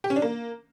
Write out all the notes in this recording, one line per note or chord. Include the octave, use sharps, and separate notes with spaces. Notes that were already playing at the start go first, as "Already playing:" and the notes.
G4
C#4
D4
A#3